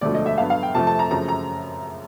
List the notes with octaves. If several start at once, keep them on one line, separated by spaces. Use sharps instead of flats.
E1 D2 D3 F3 A3 D5
D#5
E5
G2 D3 F#3 B3 F5
F5
G5
F2 C3 F3 A3 A5
A5
A#5
F#2 C#3 F3 A3 A#5
A#5